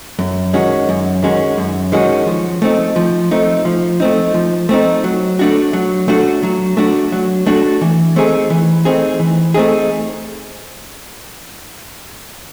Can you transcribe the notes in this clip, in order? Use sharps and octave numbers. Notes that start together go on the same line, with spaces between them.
F#2
D#3 G#3 C#4 F#4
F#2
D#3 G#3 C#4 F#4
F#2
D#3 G#3 C#4 F#4
F3
A3 C4 D#4
F3
A3 C4 D#4
F3
A3 C4 D#4
F3
A3 C4 D#4
F#3
A3 D4 F#4
F#3
A3 D4 F#4
F#3
A3 D4 F#4
F#3
A3 D4 F#4
E3
A3 C4 D#4 G#4
E3
A3 C4 D#4 G#4
E3
A3 C4 D#4 G#4